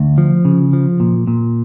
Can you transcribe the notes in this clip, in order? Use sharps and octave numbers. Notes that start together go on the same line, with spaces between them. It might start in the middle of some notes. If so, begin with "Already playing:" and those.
Already playing: D2
F3
C#3
F3
A#2
A#2